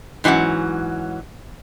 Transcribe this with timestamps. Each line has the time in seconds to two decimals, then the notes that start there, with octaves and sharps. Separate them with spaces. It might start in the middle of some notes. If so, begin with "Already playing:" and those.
0.24 G#2 E3 F#3 C#4 F#5